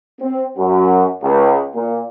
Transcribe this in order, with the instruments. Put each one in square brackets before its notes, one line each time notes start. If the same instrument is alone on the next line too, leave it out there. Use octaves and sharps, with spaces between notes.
[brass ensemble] C4
F#2
C#2
A#2